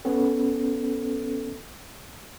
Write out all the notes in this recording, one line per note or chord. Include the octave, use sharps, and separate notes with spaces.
B3 C#4 A4